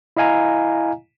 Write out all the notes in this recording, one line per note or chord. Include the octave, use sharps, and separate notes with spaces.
E4 D#5 F5 G#5 A#5